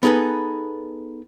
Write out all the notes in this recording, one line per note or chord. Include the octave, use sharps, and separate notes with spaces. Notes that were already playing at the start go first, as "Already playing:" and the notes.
B3 D#4 G#4 A4 B4